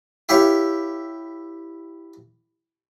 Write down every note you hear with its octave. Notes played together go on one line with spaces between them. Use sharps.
E4 G4 C#5 F5